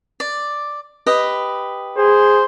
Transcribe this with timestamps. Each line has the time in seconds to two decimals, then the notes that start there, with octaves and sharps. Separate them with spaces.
0.20 D5
1.06 G4 B4 D#5
1.98 G#4 C5